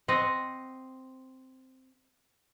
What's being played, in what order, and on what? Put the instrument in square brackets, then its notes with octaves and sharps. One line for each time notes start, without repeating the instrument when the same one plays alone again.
[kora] C4 D#5 F#5